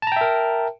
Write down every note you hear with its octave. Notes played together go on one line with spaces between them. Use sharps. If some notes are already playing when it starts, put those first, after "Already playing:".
A#4 E5 G5 A5 A#5